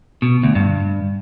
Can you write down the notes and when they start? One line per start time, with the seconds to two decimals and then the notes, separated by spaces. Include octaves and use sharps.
0.22 B2
0.43 D2
0.55 G2